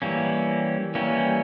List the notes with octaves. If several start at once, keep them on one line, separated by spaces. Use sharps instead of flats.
E3 G3 A#3 C#4
E3 G3 A#3 C#4